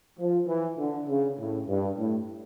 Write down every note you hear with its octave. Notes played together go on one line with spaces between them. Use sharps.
F3
E3
D3
C#3
A2
G2
A2